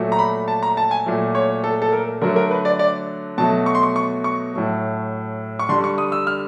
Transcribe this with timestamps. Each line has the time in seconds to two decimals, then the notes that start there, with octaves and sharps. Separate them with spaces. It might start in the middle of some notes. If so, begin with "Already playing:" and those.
Already playing: A#2 F#3 A3
0.12 A#5
0.19 B5
0.48 A5
0.63 A#5
0.77 A5
0.91 G#5
1.06 A#2 F#3 A3
1.35 C#5
1.64 A4
1.82 A4
1.92 A#4
2.21 D3 F#3 A3 A#4
2.36 A#4
2.51 B4
2.65 D5
2.79 D5
3.38 B2 F#3 A3 A5
3.66 C#6
3.75 C6
3.83 C#6
3.96 C#6
4.24 C#6
4.54 A2 F#3 A3
5.59 C#6
5.69 D3 G3 C6
5.84 C#6
5.98 D#6
6.12 E6
6.27 F6